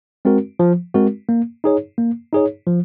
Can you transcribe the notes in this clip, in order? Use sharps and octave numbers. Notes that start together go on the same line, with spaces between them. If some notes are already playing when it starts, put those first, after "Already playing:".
G#3 C4 F#4 A#4
F3
G#3 C4 F#4 A#4
A#3
D#4 G#4 C#5
A#3
D#4 G#4 C#5
F3